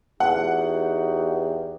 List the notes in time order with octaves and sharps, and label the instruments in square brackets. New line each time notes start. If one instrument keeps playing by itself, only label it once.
[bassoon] E2 [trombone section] D#4 F#4 G4 [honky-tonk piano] F#5